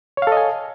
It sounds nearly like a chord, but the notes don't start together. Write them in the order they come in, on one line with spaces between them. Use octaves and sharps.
C#5 F5 A4 D#5 G#5